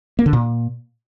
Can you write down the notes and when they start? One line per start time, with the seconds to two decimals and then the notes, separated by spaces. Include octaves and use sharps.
0.19 A#3
0.26 D3
0.33 A#2